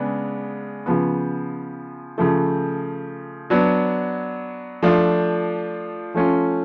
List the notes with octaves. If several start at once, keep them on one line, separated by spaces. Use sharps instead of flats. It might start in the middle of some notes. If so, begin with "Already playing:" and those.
Already playing: C#3 G#3 B3 D4
C#3 F3 B3
C#3 F3 A3
F#3 B3 D4
F3 A3 D4 F4
F3 A3 C#4 F4